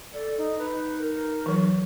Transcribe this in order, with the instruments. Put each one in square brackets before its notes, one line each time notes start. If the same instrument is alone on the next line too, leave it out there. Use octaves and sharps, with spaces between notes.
[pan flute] A4 [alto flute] D5
[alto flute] D#4
[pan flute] D#4 [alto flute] B4
[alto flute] A#4
[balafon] E3 F#3